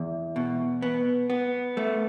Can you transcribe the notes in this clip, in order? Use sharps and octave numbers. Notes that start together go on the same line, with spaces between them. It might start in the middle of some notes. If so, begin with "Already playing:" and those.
Already playing: E2
B2
B3
B3
A3